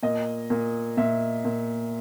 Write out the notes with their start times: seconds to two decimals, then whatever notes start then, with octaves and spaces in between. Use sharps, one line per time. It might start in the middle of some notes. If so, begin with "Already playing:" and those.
0.03 A#2 D#5
0.50 A#2
0.97 A#2 E5
1.45 A#2